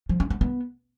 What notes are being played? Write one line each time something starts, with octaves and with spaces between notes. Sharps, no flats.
F3
C#4
B3
B3